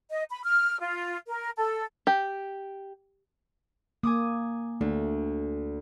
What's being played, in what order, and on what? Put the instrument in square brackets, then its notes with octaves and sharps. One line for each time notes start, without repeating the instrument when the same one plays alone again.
[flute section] D#5
B5
F6
F4
A#4
A4
[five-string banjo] G4
[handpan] A#3 [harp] G#5 D6 D#6
[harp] D2 [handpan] A3